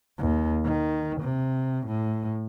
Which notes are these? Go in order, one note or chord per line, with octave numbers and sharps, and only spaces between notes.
D#2
D#3
C3
A2